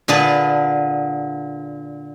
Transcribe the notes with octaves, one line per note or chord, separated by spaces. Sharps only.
A#2 D3 G#4 B4 A5